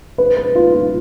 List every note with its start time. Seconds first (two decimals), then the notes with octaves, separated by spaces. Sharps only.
0.18 B4
0.37 B4
0.55 F4
0.74 F4